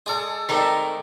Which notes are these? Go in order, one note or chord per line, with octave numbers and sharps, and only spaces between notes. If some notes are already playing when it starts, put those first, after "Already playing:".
G#3 G#4 A4 D5
D#3 G#3 A3 C4 D#4 A#4 D5 E5